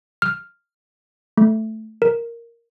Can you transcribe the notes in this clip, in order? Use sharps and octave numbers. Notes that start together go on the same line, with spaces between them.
F6
A3
A#4